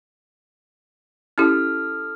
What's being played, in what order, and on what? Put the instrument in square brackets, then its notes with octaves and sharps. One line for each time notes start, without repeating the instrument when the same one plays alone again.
[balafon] C#4 E4 G4 [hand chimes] A4 F6